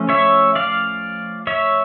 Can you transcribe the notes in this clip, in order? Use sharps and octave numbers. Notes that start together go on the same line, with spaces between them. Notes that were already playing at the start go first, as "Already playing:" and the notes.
Already playing: F3 A3 C#4
C#5 E5
D5 F5
C#5 E5